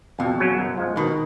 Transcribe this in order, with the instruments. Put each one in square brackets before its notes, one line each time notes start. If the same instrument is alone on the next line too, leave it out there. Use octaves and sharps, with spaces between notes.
[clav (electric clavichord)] F2 [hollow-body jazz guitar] B2
[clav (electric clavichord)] C#3 F#3 C#4
F#2
F3 G#3
[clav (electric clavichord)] B2 [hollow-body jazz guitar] D#3